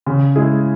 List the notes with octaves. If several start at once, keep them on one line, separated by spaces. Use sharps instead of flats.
C#3
G#3 E4 G#4